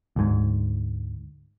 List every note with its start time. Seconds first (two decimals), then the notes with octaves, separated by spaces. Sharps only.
0.16 D2 G#2